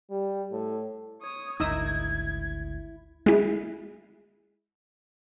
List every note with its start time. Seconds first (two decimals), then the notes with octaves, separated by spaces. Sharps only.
0.10 G3
0.52 A2
1.22 C#5 D#6
1.60 G#1 D2 G#2 D#4 E4 D#6 E6 G#6
3.26 G#3 E4